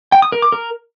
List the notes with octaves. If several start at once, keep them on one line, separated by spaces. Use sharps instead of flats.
G5
D#6
A#4
D6
A#4